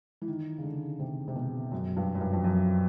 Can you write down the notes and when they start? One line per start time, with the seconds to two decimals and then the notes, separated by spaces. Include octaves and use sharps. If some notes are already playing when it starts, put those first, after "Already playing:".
0.22 E3
0.28 D#3
0.58 C#3
0.63 D3
1.00 C3
1.28 C3
1.36 B2
1.72 F#2
1.97 G2
2.15 F#2
2.21 G2
2.33 F2
2.44 F#2